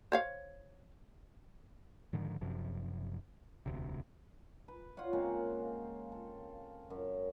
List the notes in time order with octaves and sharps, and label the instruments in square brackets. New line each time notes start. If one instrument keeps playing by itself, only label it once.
[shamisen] C5 C#5 F5
[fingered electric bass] G#2 D3 D#3 F3
F#1 F#2 C3 F3
E1 D2 C3
[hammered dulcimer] B4
F4 C#5 D5 F#5
C#3 G#3 A#3 C4
A4
F#2